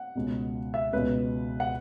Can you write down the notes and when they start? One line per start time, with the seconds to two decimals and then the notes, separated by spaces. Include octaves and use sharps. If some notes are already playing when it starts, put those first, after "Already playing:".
Already playing: F#5
0.15 C#2 B2
0.74 E5
0.93 C#2 B2 B4
1.60 F#5